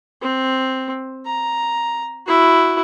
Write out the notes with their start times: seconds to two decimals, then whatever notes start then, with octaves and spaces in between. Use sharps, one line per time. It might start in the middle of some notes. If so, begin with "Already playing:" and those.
0.22 C4
1.26 A#5
2.26 E4 F#4